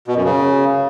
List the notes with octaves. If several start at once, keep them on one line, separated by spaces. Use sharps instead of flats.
B2
F#2
C#3